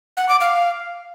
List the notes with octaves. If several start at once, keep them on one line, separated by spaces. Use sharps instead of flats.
F#5
D6
F5